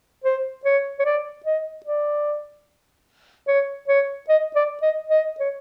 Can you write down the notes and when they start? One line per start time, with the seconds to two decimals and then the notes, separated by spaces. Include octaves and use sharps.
0.24 C5
0.65 C#5
0.99 C#5
1.05 D5
1.46 D#5
1.86 D5
3.48 C#5
3.88 C#5
4.29 D#5
4.55 D5
4.82 D#5
5.09 D#5
5.40 C#5